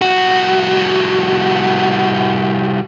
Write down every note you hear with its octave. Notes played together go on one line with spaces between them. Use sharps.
C2 F#4